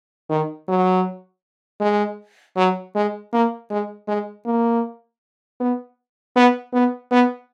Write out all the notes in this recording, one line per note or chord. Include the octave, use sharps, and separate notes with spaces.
D#3
F#3
G#3
F#3
G#3
A#3
G#3
G#3
A#3
B3
B3
B3
B3